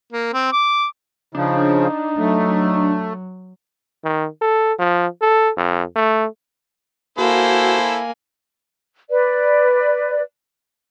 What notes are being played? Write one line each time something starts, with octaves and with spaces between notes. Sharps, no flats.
A#3
C4
D6
C#3 F3 D4 D#4
F#3 A3
D#3
A4
F3
A4
F2
A3
A#3 E4 F#4 A4 C5 G#5
B4 D5